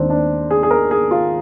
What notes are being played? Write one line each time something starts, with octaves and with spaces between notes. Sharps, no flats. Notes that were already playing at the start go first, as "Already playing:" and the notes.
Already playing: D#2 D#3 G#3 C4 D4
D4
G#4
G#4
A#4
G#4
F4